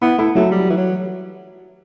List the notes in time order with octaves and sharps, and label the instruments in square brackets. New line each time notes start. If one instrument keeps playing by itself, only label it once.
[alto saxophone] B3 [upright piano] E4
[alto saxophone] A3 [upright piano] E4
[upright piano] F#3 [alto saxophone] A3
[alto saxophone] G3
E3
F#3